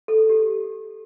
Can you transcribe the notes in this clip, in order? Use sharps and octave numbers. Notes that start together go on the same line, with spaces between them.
A4
G4